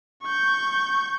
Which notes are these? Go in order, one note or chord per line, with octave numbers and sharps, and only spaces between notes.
C#6 G6